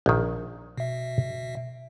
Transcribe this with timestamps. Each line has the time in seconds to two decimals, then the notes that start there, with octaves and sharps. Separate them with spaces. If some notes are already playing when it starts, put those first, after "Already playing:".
0.06 A#1 D#3
0.78 B2 E5